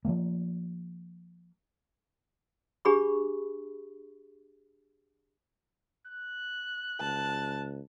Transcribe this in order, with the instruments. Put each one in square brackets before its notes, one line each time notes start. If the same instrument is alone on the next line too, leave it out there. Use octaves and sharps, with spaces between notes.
[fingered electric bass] F3 F#3 A3 A#3
[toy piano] D4 G4 G#4 B5 C#6
[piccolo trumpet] F#6
[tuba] C#2 [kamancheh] A5